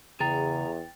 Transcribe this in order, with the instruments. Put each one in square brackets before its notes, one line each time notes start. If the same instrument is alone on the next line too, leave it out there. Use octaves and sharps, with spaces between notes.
[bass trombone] E2 [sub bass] C#3 [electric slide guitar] G#4 A#5 [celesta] G5 A6